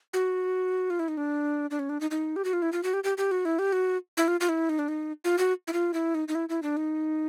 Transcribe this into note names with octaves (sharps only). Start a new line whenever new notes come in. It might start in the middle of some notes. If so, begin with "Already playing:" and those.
F#4
F4
E4
D#4
D4
D4
C#4
D4
D#4
D#4
G4
F#4
F4
E4
F4
F#4
G4
G4
G4
F#4
E4
G4
F#4
E4
F4
F4
E4
D#4
D4
D#4
F4
F#4
E4
F4
E4
D#4
D#4
E4
E4
D4
D#4